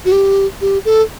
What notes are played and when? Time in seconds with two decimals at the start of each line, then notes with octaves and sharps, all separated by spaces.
0.05 F#4
0.12 G4
0.61 G4
0.85 A4